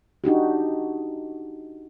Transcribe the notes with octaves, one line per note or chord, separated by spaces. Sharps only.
D4 D#4 F#4 G4